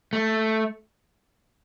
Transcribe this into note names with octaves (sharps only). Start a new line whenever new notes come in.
A3